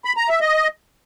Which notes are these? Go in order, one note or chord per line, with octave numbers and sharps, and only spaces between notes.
B5
A#5
E5
D#5